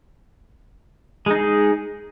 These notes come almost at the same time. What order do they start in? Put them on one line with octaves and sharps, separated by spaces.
G#3 D#4 G#4